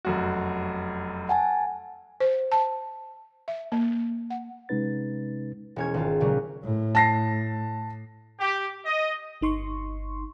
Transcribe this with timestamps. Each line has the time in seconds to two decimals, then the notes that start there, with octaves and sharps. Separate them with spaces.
0.05 F1 F#2 F#4
1.29 F#5 G#5 A5
2.20 C5
2.52 A5
3.48 E5
3.72 A#3
4.30 F#5
4.69 C3 G#3 C#4 D#4 B4 A6
5.76 E1 C#4 G#6
5.94 G#1 F4
6.20 A#2 C#3 F#3 G3 B3
6.64 A2
6.95 A5 A#6 C7
8.40 G4
8.85 D#5
9.41 G1 D#4 C6 C#6